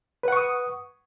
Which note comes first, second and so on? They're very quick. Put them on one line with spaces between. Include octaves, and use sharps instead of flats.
B4 F#5 C#6 D#6